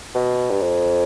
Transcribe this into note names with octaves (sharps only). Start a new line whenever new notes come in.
B2
G2
F2